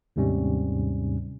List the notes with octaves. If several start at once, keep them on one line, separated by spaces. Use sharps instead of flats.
D#2 G#2 C3 G3 C#4